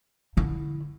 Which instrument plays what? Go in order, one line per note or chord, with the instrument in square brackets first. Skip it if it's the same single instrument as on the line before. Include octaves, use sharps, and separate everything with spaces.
[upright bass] D3 E4